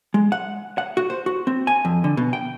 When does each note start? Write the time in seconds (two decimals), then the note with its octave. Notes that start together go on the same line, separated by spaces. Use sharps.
0.14 G#3
0.32 F#5
0.78 F#5
0.97 F#4
1.10 C5
1.26 F#4
1.47 C4
1.67 G#5
1.85 F2
2.04 D3
2.17 B2
2.33 G5